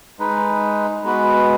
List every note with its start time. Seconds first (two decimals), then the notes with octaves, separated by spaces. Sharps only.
0.19 G#3 D#4 B4
1.03 G#3 B3 F#4 B4